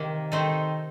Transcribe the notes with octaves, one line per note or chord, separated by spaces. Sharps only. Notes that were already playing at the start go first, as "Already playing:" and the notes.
Already playing: C3 D#3 A#3
D#3 A3 C4 D#4 A4